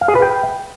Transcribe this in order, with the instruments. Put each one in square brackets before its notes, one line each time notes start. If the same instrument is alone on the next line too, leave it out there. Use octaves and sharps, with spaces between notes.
[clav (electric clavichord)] F5
G#4
B4
G5